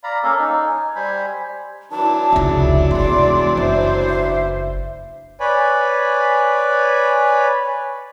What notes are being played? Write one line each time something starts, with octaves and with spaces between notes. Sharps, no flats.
D5 F5 A#5 B5
A#3 C#4 A4 F5
D#4
G#5
G3 C5 G#5 B5
E3 F#3 D4 A5
F1 C#2 E5
F1 E2 G#3 D5 C6
F#1 C5 E5
E5
B4 C#5 D5 G#5 B5